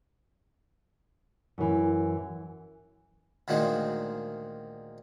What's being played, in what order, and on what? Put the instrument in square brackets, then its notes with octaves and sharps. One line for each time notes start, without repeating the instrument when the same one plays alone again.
[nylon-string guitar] F#2 E3
[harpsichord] D2 A#2 D#3 F3 G#3